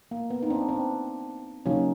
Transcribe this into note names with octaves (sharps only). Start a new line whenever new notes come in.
A#3
B3
D#4
C4 D4
C4 D4
C#3 F#3 A#3 C#4 D#4